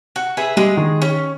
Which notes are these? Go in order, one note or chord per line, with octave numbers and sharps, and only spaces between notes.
F#4
G#4 B4 E5
G3 G#3 G#4
D#3
C#4